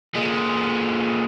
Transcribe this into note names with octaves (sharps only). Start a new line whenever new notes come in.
A#2 G#3